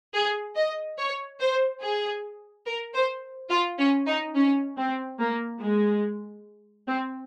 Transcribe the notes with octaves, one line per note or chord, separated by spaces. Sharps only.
G#4
D#5
C#5
C5
G#4
A#4
C5
F4
C#4
D#4
C#4
C4
A#3
G#3
C4